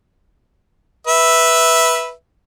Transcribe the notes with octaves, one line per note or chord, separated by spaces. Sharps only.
B4 E5